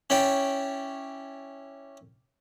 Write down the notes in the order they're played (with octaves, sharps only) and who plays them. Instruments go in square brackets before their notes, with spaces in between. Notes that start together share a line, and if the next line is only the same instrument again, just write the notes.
[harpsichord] C#4 E4 C#5 D5 G5